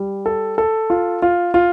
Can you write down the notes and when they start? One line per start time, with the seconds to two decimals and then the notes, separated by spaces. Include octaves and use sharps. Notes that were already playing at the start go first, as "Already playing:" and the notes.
Already playing: G3
0.26 A4
0.58 A4
0.90 F4
1.22 F4
1.54 F4